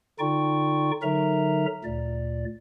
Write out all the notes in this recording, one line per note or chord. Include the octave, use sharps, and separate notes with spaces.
D3 D#4 F4 D5 G5 C#6
D3 F#3 D#4 A#4 E5 A#5
D2 A#2 D5